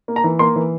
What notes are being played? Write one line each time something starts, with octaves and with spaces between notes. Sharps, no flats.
A#3
A#5
E3
A#3 C6
E3